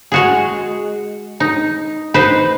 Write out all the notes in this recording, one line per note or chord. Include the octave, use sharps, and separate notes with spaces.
G#3 F#4 G#4
D#4
D#4 B4 C5